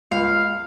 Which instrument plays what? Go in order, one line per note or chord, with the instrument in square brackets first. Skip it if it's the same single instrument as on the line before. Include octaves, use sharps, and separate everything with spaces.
[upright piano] C#2 [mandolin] F5